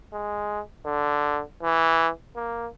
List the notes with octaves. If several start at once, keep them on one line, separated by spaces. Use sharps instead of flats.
G#3
D3
E3
A#3